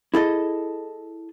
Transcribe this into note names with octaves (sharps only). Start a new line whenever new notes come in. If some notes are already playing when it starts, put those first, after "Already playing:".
E4 G#4 A4 D#5